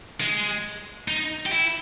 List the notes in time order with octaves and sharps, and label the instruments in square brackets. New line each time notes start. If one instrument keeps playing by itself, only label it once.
[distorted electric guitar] G#3
D#4
G4
E4